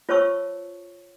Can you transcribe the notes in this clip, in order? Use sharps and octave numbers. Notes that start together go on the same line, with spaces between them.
F4 C5 C#5 A5 C#6 E6